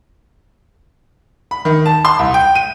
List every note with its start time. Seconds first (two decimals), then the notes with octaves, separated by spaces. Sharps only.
1.51 B5
1.65 D#3
1.86 A5
2.05 C6
2.19 C2
2.34 G5
2.55 D#7